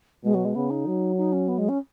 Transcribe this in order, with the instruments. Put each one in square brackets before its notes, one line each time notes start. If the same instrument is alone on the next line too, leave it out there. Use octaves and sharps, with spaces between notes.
[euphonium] B2 [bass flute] G#3
[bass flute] F#3
G#3
[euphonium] C#3 [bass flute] B3
[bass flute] D#4
[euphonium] F#3
[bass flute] D#4
C#4
B3
G#3
C#4